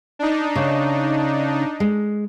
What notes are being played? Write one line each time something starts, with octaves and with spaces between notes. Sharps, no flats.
D4 D#4
C#3
G#3